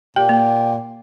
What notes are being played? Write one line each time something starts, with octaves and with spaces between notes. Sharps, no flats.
A#2 G4 G5
A#3